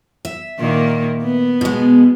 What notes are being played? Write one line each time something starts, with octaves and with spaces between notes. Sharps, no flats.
E5
A#2 D#3 A#3
B3
B2 G#3